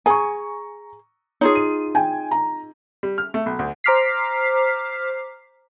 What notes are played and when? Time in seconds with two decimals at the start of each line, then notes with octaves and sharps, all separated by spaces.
0.06 G#4 G#5 A#5 C#6
1.41 D#4 F4 G#4 C#5
1.55 D#7
1.95 G5 G#5
2.31 A#5
3.03 G3
3.18 F6
3.34 A3
3.46 B1
3.59 D2
3.84 C5 A#5 D6 F6 B6 C7